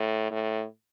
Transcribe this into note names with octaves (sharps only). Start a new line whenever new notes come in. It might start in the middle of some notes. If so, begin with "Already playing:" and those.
Already playing: A2
A2